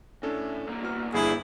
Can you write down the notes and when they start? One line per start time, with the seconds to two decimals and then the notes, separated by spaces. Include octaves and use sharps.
0.23 A2 C#4 D4 A4
0.67 C2 A#3
0.82 B3 F#4 F6
1.14 G1 G2 E4 G#4